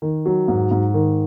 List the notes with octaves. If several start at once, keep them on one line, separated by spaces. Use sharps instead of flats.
D#3
F#3
G#2
G#2
D#3